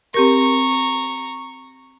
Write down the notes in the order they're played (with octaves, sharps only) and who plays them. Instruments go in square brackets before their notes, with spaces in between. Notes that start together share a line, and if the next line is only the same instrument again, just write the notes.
[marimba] C4 G4 A#4 [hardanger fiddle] A#5 C#6